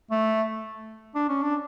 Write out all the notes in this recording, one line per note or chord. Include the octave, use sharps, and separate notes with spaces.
A3
D4
C#4
D4